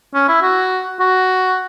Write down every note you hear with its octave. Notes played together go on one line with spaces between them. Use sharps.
C#4
E4
F#4
F#4